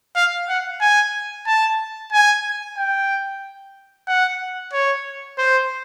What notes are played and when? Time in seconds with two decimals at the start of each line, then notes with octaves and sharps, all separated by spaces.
0.16 F5
0.49 F#5
0.81 G#5
1.47 A5
2.12 G#5
2.77 G5
4.07 F#5
4.73 C#5
5.38 C5